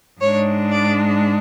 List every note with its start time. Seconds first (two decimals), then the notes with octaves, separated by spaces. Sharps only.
0.21 G#2 G#3 D4 C#5
0.72 D5